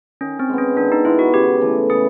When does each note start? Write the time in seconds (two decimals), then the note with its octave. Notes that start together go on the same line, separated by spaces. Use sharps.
0.21 D#3 C#4
0.39 C4
0.49 G#3 B3
0.58 C#4
0.77 D#3 D4
0.92 D#4
1.05 G#3 B3 E4
1.19 F#4
1.34 C#3 G4
1.61 E3 A3
1.90 C#3 G#4